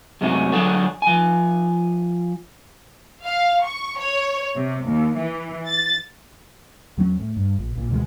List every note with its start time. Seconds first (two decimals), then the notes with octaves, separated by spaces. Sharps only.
0.21 F#2 C3 G#3 A3 C#4 F#4
0.52 D3 F#3 F4 G#4 A4 C#5
1.02 F3 G#5
3.25 F5
3.64 C#6
4.00 C#5
4.56 C3
4.85 D#2
5.17 E3
5.67 A6
6.97 E2 F#3 G#3 C#4
7.20 A2
7.36 G2
7.59 A#1
7.75 A#1 A#2
7.90 D2 B2 D#3 G#3